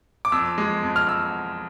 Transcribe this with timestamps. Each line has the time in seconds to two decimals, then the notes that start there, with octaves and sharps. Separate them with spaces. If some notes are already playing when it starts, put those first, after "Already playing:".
0.25 D6
0.32 F2 E6
0.58 G#3
0.83 F2
0.96 F6
1.09 E6